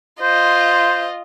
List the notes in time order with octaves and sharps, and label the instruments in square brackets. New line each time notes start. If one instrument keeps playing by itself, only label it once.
[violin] F4 D#5 [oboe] C5